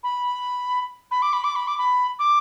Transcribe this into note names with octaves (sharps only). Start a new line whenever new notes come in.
B5
B5
D6
B5
D6
B5
D6
B5
D6